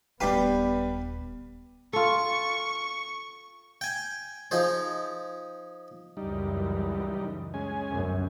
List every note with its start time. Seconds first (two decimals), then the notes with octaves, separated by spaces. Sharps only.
0.20 D#1 G3 B3 D4 G4 B4 F5 B5
1.93 F4 A4 C#6
3.81 G5 G#5
4.51 F3 D#4 G#4 C5
6.17 C#2 F#2 E3 G3 D#4
7.54 G#3 C#4 G#5
7.90 G1 C2 F#2